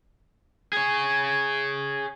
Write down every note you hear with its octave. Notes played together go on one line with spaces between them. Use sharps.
G#4 C#5